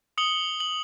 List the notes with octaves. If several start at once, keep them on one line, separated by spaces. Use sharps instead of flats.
D#6 C#7 F#7 G7
F#7